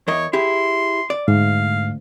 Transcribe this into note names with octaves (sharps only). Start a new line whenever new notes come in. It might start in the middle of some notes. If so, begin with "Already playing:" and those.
E2 A#4 C#5 D#5
E4 G4 G#4 C6
D5
D2 G#2 F5